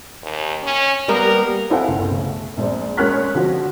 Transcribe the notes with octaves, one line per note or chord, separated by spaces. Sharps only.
D#2
C#4
G3 A#3 B3 A#4
C4 E4 A4 F5 F#5 G#5
G1 C#2
C#3 A3
A#1 G#3 C4 D5
G#3 C#4 A#4 F6 F#6 B6
D3 F3 C4 F#4